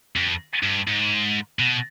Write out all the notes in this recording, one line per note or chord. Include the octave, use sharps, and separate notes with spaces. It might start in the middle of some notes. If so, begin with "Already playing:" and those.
F2
G2
G#2
B2